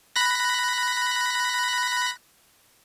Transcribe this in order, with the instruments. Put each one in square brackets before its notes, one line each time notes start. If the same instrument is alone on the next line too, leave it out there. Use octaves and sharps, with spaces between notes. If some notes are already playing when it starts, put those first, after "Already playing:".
[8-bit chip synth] B5 F#6 A#6